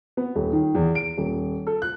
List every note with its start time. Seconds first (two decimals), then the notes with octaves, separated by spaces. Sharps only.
0.17 B3
0.35 D#1
0.53 D#3
0.75 E2
0.95 D7
1.18 D#1
1.67 A4
1.82 F#6